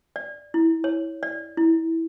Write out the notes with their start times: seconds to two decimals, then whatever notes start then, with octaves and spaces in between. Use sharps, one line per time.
0.16 D5
0.54 E4
0.84 C#5
1.23 D5
1.57 E4